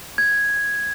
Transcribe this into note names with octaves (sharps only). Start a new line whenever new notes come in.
G#6